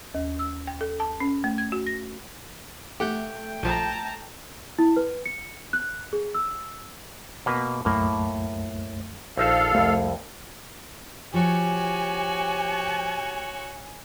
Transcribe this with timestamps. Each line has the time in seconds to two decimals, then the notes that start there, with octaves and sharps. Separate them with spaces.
0.15 D#2
0.39 E6
0.67 G5
0.81 A4
1.00 A5
1.20 C#4
1.44 A3
1.58 G#6
1.72 F#4
1.87 A#6
3.00 A3 G4 F#5 G5 G6
3.63 A#1 F3 A5 A#5
4.79 E4
4.97 B4
5.26 C#7
5.73 F#6
6.13 G#4
6.35 E6
7.46 B2 A#3 B4
7.85 C2 F#2 A2 A3 A#3
9.37 A#1 D#4 A4 C5 F5
9.75 C2 F2 A3
11.34 F3 F#4 G4 C#5 G#5